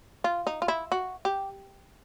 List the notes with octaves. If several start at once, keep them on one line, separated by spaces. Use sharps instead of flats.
F4
D#4
F4
E4
F#4
G4